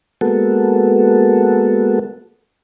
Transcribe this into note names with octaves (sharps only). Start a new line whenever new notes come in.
G#3 A#3 B3 F#4 A4